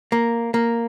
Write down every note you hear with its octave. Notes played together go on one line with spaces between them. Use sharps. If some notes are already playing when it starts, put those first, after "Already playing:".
A#3
A#3